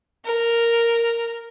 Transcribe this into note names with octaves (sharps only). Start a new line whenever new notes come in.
A#4